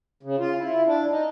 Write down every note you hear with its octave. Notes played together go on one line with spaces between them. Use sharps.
C#3
F4
E4
D4
D#4